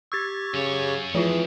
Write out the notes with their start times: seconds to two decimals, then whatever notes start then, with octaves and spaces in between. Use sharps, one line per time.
0.12 G4 C#6 E6 G#6 A6
0.54 F#2 C#3 C#5
1.15 F2 E3 F3 F4 G#4